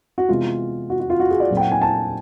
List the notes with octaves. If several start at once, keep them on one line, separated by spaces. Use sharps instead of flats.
F#4
C3 E3 G#3 B3 F4
F#4
F#4
F4
F#4
G#4
D5
A#2 F#3 A3 C4
G5
F#5
G#5
A5